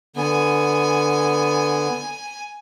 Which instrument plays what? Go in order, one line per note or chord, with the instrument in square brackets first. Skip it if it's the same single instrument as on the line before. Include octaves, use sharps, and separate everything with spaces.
[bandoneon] D3 B3 [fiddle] G#5